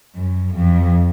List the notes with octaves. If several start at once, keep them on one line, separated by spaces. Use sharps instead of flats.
F#2
F2